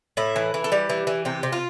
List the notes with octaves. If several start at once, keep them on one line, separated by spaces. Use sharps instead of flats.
A2 E4
E3
E3
A4
G3 G4
E3
E3
C3 G4
C3
F4